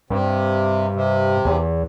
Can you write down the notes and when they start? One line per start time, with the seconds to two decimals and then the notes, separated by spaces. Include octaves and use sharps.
0.10 G2 C3
0.94 C3
1.45 E2